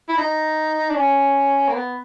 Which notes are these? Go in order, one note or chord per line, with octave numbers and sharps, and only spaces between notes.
E4
D#4
D4
C#4
A#3
B3